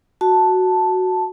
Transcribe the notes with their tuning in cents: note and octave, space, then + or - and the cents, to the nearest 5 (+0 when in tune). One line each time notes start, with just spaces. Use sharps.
F#4 +0 A5 +0